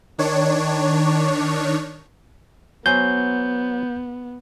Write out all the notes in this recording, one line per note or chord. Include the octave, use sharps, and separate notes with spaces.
D#3 D4 C#5
F#3 B3 C5 G#5 G6